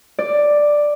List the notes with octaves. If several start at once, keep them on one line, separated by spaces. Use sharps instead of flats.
D5